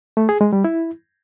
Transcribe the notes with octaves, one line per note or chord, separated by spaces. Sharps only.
A3
G#4
G#3
G3
E4